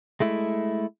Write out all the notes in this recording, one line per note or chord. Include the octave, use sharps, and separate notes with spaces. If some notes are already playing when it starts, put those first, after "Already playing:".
G#3 A3 E4